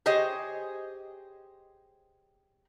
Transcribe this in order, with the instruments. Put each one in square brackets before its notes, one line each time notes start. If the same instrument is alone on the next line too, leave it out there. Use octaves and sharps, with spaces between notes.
[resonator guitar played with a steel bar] G4 G#4 C5 C#5 D#5